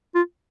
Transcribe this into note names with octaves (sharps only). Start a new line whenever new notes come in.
F4